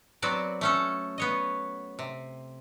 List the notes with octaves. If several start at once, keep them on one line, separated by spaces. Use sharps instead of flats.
F#3 B3 C4 F#4 D5
A3 C#4 A4
B3 C#5 D#5
C3